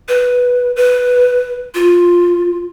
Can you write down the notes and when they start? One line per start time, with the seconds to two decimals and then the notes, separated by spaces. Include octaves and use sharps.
0.08 B4
0.76 B4
1.75 F4